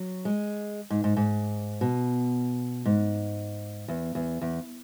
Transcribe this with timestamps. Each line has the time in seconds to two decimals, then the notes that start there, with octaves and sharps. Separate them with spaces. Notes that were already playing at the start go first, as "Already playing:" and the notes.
Already playing: F#3
0.25 G#3
0.90 G#2
1.04 G#2
1.17 G#2
1.81 B2
2.85 G#2
3.88 E2
4.15 E2
4.41 E2